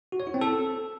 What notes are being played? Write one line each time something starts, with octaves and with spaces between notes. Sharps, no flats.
F#4
C#5
E4
C4
A4